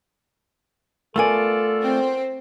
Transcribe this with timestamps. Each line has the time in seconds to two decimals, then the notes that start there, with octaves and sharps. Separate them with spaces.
1.16 A3 B3 F4 A4 A#4 D5 G#5
1.83 C4